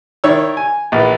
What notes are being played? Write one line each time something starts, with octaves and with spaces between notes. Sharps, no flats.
D#3 E4 C#5 D5 E6
G#5
A#1 E3